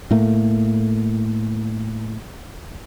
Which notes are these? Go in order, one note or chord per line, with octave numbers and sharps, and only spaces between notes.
A2 A3 A#3